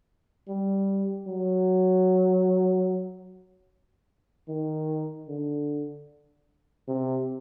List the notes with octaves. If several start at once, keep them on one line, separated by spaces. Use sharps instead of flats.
G3
F#3
D#3
D3
C3